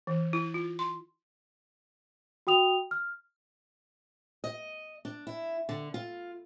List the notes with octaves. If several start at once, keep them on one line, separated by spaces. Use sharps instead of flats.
E3
E4
F4
C6
F#4 G5 D#6 F7
F6
D#5
D4
E4
D3
F4